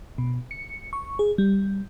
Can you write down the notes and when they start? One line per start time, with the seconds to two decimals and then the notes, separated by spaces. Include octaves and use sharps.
0.18 B2
0.51 C#7
0.93 C#6
1.19 G#4
1.38 G3